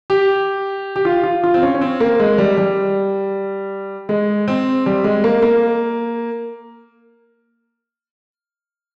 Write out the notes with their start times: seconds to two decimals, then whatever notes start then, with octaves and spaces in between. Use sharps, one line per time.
0.10 G4
0.96 G4
1.05 F4
1.23 F4
1.44 F4
1.54 C4
1.62 C#4
1.74 C#4
1.81 C4
2.00 A#3
2.19 G#3
2.38 G3
2.57 G3
4.09 G#3
4.48 C4
4.86 G3
5.04 G#3
5.24 A#3
5.42 A#3